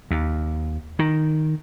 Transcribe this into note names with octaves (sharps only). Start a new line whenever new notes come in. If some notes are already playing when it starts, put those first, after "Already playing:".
D#2
D#3